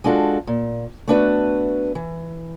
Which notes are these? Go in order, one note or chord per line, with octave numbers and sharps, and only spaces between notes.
G#3 D4 F4 F#4 A4
A#2
A3 B3 D4 F#4 B4 E5
E3